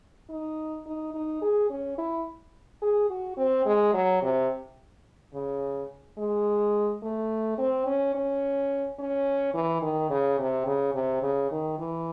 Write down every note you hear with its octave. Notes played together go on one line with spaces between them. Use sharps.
D#4
D#4
D#4
G#4
C#4
E4
G#4
F#4
C4
G#3
F#3
C3
C#3
G#3
A3
C4
C#4
C#4
C#4
E3
D#3
C#3
C3
C#3
C3
C#3
D#3
E3